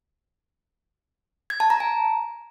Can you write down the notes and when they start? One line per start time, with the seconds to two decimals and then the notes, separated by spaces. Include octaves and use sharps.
1.50 G#6
1.60 A5
1.70 A#5
1.80 G#5